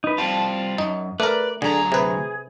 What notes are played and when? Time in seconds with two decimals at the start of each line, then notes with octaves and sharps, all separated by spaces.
0.04 D#4 B4
0.18 G3 C4 F4 A5
0.78 F#2 D#4
1.20 A3 A#4 B4 D5
1.62 D2 D3 F#3 G#4 A#5
1.92 C3 G#4 B4